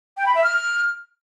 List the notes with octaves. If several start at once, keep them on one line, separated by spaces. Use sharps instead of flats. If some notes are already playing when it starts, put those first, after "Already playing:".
G5
B5
E5
F6